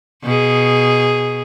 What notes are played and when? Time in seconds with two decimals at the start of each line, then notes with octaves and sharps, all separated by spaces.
0.23 B2 G#4